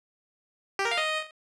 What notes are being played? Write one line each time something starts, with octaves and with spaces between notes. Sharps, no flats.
G4
A#4
F5
D#5